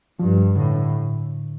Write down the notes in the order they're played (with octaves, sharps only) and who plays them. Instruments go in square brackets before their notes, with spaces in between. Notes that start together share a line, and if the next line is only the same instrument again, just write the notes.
[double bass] G2 [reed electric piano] F3
[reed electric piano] G3
[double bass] A2 [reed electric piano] D3
[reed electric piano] D3